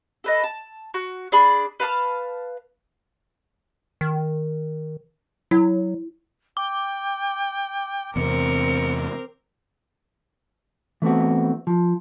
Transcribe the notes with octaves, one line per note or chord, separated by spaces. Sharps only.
A4 B4 D#5
A5
F#4
D4 G#4 B5
B4 F5 A5 F6
D#3
F#3 E4
G5 D6
E2 C3 C4 A#4 C#7
E3 A3 B3 C4 F#4
F3